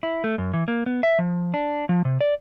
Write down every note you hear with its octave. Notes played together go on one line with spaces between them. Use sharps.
E4
A3
F#2
E3
A#3
B3
E5
F3
D4
F3
C3
D5